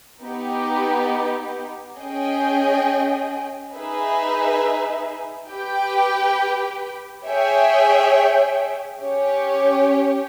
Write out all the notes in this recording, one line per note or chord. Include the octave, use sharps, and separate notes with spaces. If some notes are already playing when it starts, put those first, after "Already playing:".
B3 D#4 G4
C#4 G#4 D#5 G5
D#4 G#4 B4 E5
G4 B4 G5
G#4 C#5 E5 G5
C#4 G4 C#5